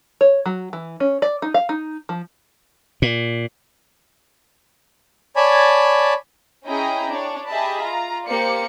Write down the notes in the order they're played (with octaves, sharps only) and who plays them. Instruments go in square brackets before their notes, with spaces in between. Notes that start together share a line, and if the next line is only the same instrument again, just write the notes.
[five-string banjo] C#5
F#3
E3
C#4
D5
D#4
F5
D#4
F3
[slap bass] A#2
[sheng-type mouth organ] C#5 D5 G#5 A5 B5
[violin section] C#4 E4 G#4 D#5 G5 A#5
D4 C#5
G4 G#4 D#5 E5 A5 B5
F4 A#5
A#3 G4 C5 D5 C#7